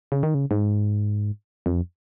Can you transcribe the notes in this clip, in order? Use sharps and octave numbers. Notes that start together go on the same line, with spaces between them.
C#3
D#3
C#3
G#2
F2